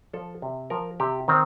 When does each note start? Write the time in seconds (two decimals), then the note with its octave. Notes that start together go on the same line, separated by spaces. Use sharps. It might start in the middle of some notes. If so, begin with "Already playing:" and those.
0.13 F3 A4
0.42 C3
0.70 F3 A#4
1.00 C3 G4
1.28 D#3 C4